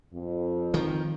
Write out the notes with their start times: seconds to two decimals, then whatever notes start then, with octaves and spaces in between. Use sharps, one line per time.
0.13 F2
0.74 D#3 F3